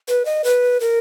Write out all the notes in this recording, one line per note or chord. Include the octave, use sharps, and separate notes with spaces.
B4
D#5
B4
A#4